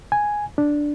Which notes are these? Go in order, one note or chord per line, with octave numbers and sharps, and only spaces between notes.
G#5
D4